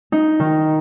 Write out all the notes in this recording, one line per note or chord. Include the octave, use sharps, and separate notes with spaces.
D#4
D#3